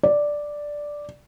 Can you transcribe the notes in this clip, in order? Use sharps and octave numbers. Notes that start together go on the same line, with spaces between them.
D5